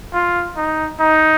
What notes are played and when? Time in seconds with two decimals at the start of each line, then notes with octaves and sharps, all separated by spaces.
0.14 F4
0.57 D#4
1.00 D#4